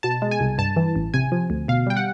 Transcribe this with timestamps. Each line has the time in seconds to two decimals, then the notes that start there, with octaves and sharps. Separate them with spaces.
0.03 B2 A5
0.22 G#3
0.31 G#5
0.40 C2
0.58 G2 A5
0.76 E3
0.96 A1
1.14 C3 G#5
1.32 F3
1.50 D2
1.68 B2 F5
1.87 G3 G5
1.97 F#5